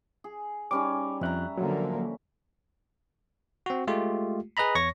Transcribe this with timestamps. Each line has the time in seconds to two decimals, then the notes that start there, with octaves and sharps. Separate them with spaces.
0.24 G#4
0.71 G3 C#4 D#4 D6
1.21 F2 E5 A#5 F#6
1.58 D3 F3 F#3 A#3
3.66 C4 F#4
3.87 G#3 A3 F4 G4
4.57 G#4 B4 D#5 A#5 B5
4.75 E2 C#5 C#6 A#6